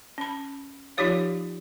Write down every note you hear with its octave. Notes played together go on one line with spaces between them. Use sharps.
C#4 B5
F3 D#4 F4 G4 C#5 F5